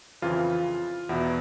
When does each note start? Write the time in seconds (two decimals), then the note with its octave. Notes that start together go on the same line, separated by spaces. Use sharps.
0.22 F2 C#3 E3 F4
1.09 E2 B2 E4 F#4